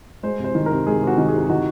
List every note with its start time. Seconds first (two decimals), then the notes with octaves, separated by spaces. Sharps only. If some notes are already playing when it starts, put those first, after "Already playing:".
0.23 G#3 C5
0.40 C3 C5
0.55 D#3
0.66 C3 A#4
0.87 G#3 G#4
1.02 C3 F#4
1.18 D#3
1.29 G#4
1.34 C3
1.50 D#3 F#4